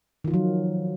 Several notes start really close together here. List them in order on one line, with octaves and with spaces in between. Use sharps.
D#3 F4 F3 F#3